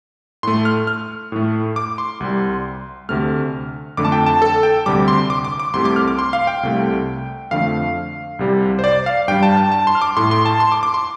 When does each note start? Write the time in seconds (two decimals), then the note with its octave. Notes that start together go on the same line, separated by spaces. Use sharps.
0.43 A2 A3 C6
0.65 F6
0.87 F6
1.32 A2 A3
1.76 D6
1.98 C6
2.20 C2 C3 G3
3.09 D2 C3 A3 F6
3.97 F2 D3 A3 D6
4.05 A5
4.12 G5
4.26 A5
4.42 A4
4.63 G5
4.86 D2 C3 G3 D6
5.08 C6
5.30 D6
5.45 D6
5.60 D6
5.74 C2 C3 A3 C6
5.85 D6
5.96 F6
6.08 D6
6.19 C6
6.33 F5
6.47 G5
6.63 C2 C3 A3
7.51 F2 D3 F3 A3 F5
8.39 C2 C3 G3
8.79 C5
8.84 D5
9.06 F5
9.28 G2 G3 G5
9.43 A5
9.57 A5
9.72 A5
9.87 C6
9.95 F6
10.01 D6
10.17 A2 A3 C6
10.31 C6
10.46 A5
10.60 C6
10.72 D6
10.83 D6
10.94 C6